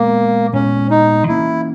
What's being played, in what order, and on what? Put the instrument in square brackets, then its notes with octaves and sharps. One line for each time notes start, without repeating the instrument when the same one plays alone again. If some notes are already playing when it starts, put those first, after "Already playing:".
Already playing: [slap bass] A#2 G#3 B3 [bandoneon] A#3
[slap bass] A#2 G#3 B3 [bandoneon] C#4
[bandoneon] D#4
[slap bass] E3 A#3 C#4 [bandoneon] E4